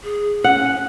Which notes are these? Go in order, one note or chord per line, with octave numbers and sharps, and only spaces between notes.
G#4
C#4 F#5